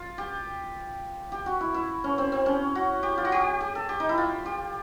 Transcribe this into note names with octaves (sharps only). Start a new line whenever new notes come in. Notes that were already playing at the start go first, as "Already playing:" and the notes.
Already playing: F4
G4
G4
F#4
E4
E4
C#4
C4
C4
C#4
F#4
G4
F4
F#4
G4
G#4
A4
G4
D#4
E4
F4
G4